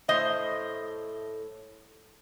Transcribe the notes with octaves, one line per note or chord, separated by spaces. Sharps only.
A2 A3 C5 D#5